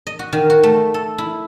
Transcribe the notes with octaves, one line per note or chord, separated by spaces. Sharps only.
D#5
F#4
D#3
F#4
A3
A4
E4